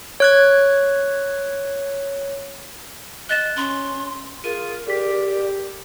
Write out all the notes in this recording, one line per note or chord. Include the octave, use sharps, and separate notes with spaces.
C#5 F#6 G#6
D#5 F#6 A6 E7
C#4 C6
F4 G#4 A#4 D#7
G4 G#4 D5 B6